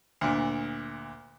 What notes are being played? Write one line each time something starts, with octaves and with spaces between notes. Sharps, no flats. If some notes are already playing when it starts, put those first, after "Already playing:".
D2 A#2